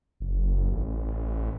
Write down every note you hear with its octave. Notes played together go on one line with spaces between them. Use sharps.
F#1
A1